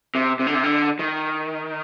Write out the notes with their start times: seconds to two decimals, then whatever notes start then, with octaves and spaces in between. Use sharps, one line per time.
0.15 C3
0.39 C3
0.47 D3
0.54 C3
0.63 D3
0.99 D#3